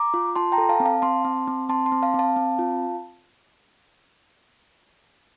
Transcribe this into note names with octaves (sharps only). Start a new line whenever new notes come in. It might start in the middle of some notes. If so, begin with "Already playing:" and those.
Already playing: A#5 D6
F4
F4 A5 C6
G5 A#5
A4
F5 A5
C4
F5 A5
C4 A5 C6
C4
C4
C4 A5 C6
A5 C6
C4
F5 A5
C4 F5 A5
C4
F4